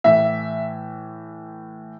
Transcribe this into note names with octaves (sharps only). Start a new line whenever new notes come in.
A2 E3 E5